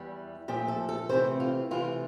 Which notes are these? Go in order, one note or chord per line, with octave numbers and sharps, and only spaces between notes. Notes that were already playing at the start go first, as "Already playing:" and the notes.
Already playing: E2 E3 G3
A#2 F3 A3 G4
A4
A4
C3 E3 A3 C4 C5
F4
C3 E3 A3 F4